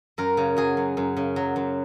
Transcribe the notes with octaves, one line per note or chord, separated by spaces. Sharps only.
F#2 A#4
C#3
F#3 G#4
F#2
F#2
C#3
F#3
F#2